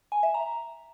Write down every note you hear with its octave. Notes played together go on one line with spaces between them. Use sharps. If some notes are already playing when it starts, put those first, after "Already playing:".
G#5
E5
A#5